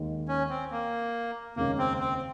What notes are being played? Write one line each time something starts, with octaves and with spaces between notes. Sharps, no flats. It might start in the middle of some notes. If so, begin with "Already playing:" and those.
Already playing: D#2 D#3 G#3
C#4
C4
A#3
F1 D#2 C#3 G#3 A#3 C#4
C4
C4